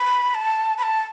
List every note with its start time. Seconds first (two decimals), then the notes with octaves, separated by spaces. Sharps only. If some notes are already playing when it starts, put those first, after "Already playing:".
Already playing: B5
0.35 A5
0.78 B5
0.83 A5